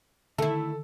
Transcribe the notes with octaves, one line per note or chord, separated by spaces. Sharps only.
D3 D#3 A3 E4 A4